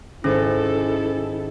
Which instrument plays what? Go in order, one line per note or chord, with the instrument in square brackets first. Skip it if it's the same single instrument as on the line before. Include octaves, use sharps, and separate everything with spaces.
[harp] G#1 [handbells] C#4 [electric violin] E4 A4